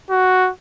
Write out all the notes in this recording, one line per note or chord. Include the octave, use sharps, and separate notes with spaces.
F#4